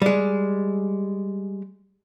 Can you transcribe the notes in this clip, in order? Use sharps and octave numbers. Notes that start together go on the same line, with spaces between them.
G3 G#3